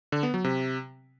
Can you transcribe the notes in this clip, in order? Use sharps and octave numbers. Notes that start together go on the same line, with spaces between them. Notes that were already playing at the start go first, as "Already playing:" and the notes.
D3
B3
F#3
C3